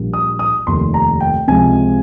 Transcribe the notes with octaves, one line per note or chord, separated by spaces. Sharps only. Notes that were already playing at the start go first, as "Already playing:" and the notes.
Already playing: A#1 A#2 G3
D#6
D#6
F1 D#2 D#3 C6
A#5
G5
C#2 C3 F3 G#3 G#5